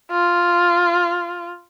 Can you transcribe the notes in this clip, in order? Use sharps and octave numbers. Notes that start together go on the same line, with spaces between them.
F4